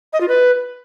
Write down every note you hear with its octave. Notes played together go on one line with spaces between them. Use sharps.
D#5
F4
B4